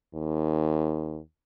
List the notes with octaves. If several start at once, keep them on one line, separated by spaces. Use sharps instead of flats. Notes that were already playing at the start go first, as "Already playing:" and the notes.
D#2